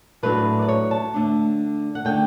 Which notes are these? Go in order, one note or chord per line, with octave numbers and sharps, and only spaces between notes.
A2 F#3 A3 D4 B4
D5
C#5
A5
D3 A3 D4
F#5
D3 A3 G5